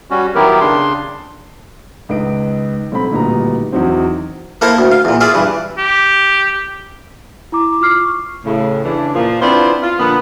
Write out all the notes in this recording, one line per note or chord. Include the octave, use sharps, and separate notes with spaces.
G3 C#4 F#4
D#3 F#3 B3 E4 G4 A#4
C#3 D4 C6
C#2 D#3 B4 D#5 D7
B1 C4 B5
D1 A#2 D#3 G3 B3 A#5
E2 D#3 F#3 C4
A#3 E4 A4 A#4 C5 F5
D2
F5
E2 A#2
F4 G#4 D5 E5 F5
G2 E3
G4
E4 A#5 D6
F4 D6 F6 C7
C#6
A2 C#3
C#3 E3 D4
A#2 F3
B3 C4 D4 E4 F4 C5
F4
A#2 D3 F3 B3